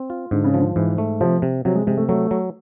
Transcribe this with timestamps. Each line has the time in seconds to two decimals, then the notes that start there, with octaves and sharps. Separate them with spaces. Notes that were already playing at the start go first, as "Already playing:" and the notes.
Already playing: C4
0.10 F4
0.31 G#2 D3
0.44 C#3
0.54 D3 F3
0.76 G#2 E3
0.98 A3
1.21 C3 F3
1.42 C3
1.65 C3 F#3
1.75 G#3
1.86 C3 G#3
1.97 A3
2.09 F#3 A3
2.31 F#3